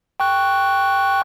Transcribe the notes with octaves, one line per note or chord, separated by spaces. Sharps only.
G5 C#6 F#6